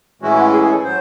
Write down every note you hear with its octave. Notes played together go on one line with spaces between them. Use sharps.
A2 E3 G#3 C#4 E4 F#4
F#4
G#4
G#4
A4
F#3 C5